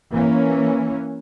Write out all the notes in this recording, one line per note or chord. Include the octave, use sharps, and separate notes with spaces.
E3 A#3 C#4